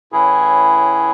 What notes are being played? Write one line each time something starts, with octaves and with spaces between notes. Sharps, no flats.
A2 E3 C#4 E4 G#4